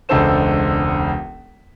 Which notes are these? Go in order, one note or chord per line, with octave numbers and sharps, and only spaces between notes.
E1 C#2 D4 A4 C5 E7